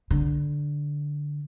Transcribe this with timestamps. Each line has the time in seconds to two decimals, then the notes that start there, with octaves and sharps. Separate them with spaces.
0.11 D3